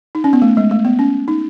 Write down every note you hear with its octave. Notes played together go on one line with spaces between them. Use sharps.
D#4
C#4
B3
A3
G#3
A3
B3
C#4
D#4